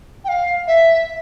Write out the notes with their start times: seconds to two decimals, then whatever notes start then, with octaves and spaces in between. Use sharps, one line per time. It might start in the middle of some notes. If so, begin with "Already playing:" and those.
0.24 G5
0.28 F5
0.67 E5